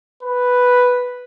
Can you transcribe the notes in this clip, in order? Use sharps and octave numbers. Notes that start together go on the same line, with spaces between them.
B4